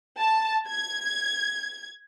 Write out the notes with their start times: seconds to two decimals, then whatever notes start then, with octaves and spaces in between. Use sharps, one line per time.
0.18 A5
0.68 G#6